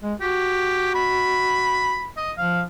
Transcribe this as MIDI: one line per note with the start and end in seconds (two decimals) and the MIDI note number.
0.03 0.14 56
0.21 2.06 66
0.21 0.90 67
0.95 2.08 83
2.17 2.32 75
2.38 2.64 53
2.38 2.61 77